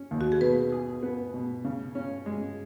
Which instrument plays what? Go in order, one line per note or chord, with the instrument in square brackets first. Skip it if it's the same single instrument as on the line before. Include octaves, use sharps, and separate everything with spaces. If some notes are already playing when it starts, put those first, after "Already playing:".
Already playing: [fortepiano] C#4
D#2
[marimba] F#4
G#4
[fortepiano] B2 [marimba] B4
[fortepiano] G#4
B3
B2
C#3
C#4
G#3